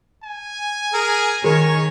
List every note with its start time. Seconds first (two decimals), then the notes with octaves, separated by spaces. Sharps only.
0.24 G#5
0.93 G#4 A#4
1.44 D#3 G#4 A#4 C#5